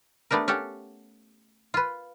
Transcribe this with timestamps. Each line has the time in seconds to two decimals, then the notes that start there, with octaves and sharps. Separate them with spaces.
0.31 A3 B3 D4 G4 A#4
0.48 C#4 G4 A4 F#5
1.74 F4 B4